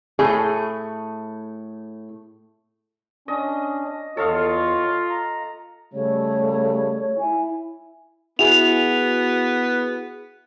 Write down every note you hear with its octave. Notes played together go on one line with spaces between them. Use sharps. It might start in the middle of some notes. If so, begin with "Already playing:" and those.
A2 A3 G#4
C#4 D4 D#5
E2 F4 A4 C#5 D#5 F5 C#6
A#5
C#3 G3 A3 C#5
E4 G#5
B3 E4 F#4 G#4 F7